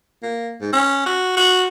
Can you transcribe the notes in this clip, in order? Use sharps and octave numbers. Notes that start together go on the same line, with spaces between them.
A#3
G#2
C#4
F#4
F#4